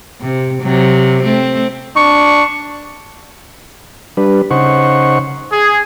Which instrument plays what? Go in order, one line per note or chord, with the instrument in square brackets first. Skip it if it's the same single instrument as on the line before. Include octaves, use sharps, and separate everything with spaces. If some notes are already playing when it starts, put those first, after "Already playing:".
[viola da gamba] C3
C3 F#3
A3 C4
[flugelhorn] D4 [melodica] C#6
[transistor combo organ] G3 D4 B4
C#3 D#4 C5 F#5 C#6
[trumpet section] G#4